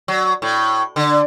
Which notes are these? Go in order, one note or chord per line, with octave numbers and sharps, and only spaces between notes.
F#3
A2
D3